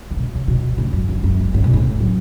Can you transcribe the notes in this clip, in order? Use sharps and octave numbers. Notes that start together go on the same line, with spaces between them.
C#3
B2
C#3
B2
A2
F#2
E2
F#2
G#2
A2
B2
A2
F#3